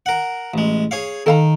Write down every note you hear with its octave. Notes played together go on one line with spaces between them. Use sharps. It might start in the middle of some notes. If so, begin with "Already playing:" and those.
A#4 F#5
A1 G#3
G#4 C#5 F5
D#3 A4 F5 A#5